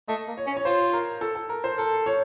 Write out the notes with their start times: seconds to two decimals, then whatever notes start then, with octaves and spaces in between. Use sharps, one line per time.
0.08 A3 D#5
0.28 A#3
0.38 C#5
0.46 C#4
0.57 C#5
0.65 F4 C5
0.93 A#4
1.21 A4
1.35 A4
1.49 A#4
1.64 C5
1.78 A4 A#4
2.06 C#5